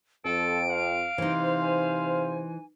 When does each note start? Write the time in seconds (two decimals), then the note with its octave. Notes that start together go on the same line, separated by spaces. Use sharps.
0.25 F2 F3 C4 A4 D7
0.70 F5
1.18 C3 E3 D#4 C5
1.61 G#5